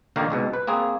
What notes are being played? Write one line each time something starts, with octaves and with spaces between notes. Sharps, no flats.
A#1 D#2 D3 D#3 A#3 F5
C2 G#2 B2
B4
A#3 C4 G#4